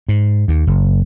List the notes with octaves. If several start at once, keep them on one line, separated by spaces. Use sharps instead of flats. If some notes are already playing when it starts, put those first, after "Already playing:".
G#2
D#2
F#1